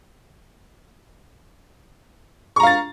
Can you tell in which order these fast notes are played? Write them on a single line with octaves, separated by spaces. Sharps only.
C#6 A#5 F5 A6